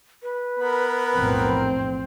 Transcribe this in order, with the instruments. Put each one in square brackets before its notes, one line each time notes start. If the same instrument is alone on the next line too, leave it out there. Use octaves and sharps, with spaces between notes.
[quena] B4
[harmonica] B3 A#4 B5
[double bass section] B1 F2 A2 [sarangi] C4